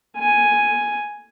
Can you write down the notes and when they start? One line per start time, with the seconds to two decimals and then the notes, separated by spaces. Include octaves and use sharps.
0.17 G#5